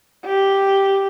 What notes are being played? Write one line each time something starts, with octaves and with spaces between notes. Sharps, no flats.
G4